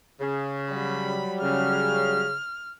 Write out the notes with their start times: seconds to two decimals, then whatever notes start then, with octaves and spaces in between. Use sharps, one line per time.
0.20 C#3
0.71 F#3 G3 B5
1.42 C#3 F6